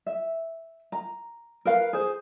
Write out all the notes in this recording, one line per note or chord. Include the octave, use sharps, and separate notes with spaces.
E5
A#5
A#4 B4 F5
G#4 C5